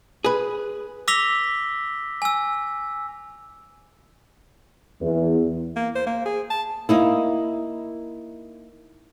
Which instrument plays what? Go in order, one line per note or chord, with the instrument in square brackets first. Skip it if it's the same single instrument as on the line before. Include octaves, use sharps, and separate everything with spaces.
[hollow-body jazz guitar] G#4 B4
[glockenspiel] D6 E6 A#6 B6 F7 G7
G#5 E6
[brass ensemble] E2
[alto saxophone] A#3
C5
A#3
G#4
A5
[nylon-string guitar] A#3 D#4 E4